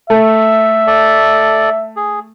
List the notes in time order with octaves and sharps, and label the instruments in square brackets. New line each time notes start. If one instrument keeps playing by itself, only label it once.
[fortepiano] A3 [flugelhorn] E5
[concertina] A4 D5
G#4